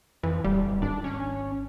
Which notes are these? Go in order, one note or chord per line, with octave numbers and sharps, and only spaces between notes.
F2 E3
D1 G3
G#1 D4
C#4